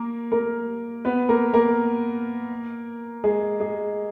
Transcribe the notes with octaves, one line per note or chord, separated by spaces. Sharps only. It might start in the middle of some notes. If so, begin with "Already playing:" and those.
Already playing: A#3 A#4
A#3 A#4
B3 B4
A#3 A#4
A#3 A#4
G#3 G#4
G#3 G#4